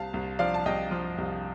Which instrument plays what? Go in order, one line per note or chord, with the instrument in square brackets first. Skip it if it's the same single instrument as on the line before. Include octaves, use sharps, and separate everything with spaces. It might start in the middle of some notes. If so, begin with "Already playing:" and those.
Already playing: [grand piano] C2 F5 A5
C2
F3 D5 F5
A5
C2 D#5 G5
F3
C2